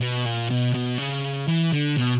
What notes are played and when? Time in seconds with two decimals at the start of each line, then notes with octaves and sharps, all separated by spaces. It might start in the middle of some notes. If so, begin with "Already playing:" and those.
0.01 B2
0.25 A#2
0.50 B2
0.74 B2
0.98 C#3
1.48 E3
1.73 D3
1.97 B2